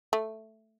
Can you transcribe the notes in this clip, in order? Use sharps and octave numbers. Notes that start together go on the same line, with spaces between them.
A3